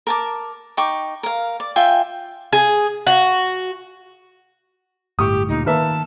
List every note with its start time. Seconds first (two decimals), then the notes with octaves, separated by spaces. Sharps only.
0.07 A#4 A5 D6
0.77 D#4 G5 C#6 D6
1.23 A#4 F5
1.60 D5
1.76 F4 E5 G5 G#5
2.53 G#4
3.07 F#4
5.19 G1 A2 G4 C#6 D#6
5.49 D2 A#2 D#4
5.66 D#3 A#3 B4 E5 A5